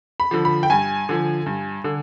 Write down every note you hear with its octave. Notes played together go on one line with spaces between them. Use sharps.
B5
D3 F3
B5
G5
G2 G#5
D3 F3
G2
D3